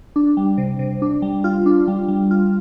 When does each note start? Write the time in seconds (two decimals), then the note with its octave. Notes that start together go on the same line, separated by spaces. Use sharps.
0.16 D4
0.37 G3
0.58 C3
0.79 C3
1.02 D4
1.22 G3
1.44 F4
1.66 D4
1.88 G3
2.08 G3
2.31 F4